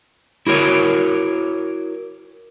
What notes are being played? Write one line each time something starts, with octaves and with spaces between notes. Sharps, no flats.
E4 F#4 A#4 C#5